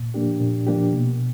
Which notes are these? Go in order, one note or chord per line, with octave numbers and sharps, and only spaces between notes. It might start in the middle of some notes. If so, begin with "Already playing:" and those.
Already playing: A#2
F3 A#3 D4 G4
A#2
F3 A#3 D4 G4
B2